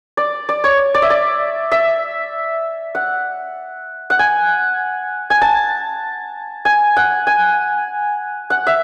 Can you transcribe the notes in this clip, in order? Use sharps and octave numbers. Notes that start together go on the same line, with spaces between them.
D5
D5
C#5
D5
E5
D5
E5
F#5
F#5
G#5
G#5
A5
G#5
F#5
G#5
F#5
E5